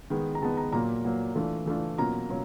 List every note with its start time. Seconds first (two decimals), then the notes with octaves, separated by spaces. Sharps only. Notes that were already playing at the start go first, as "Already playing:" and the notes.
0.10 D#3 G#3 B3
0.35 A#5
0.41 D#3 G#3 B3 A5
0.57 A#5
0.72 A#2 F#3 A#3 A#5
1.05 A#2 F#3 A#3
1.35 E3 A3 D4 F4
1.66 E3 A3 D4 F4
1.98 B2 F#3 A#3 C#4 F4 A#5
2.30 B2 F#3 C#4 F4